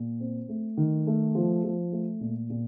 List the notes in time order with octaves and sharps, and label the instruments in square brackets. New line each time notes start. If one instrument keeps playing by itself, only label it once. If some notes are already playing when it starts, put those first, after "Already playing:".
Already playing: [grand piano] A#2
C4
A3
D#3
A3
F3
F3
A3
A#2
A#2